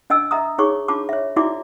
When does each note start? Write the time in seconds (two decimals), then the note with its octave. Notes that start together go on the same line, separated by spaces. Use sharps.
0.10 D4 D#5 G#5 E6
0.31 D#5 E5 A#5 D#6
0.58 D#4 G#4 C#5 C#6 D6
0.88 D4 F4 A5 B5 D6
1.09 C#5 E5
1.36 D#4 E4 F#4 D5 E5 D6